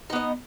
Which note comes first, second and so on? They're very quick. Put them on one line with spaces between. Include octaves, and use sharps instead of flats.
D#4 B3 D#5